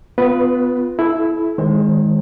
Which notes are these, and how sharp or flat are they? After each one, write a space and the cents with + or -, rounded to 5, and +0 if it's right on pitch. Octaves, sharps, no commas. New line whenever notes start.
B3 +25 F4 +0 B4 -10
E4 +0 A4 -40
D#3 +10 G#3 +0 C5 +40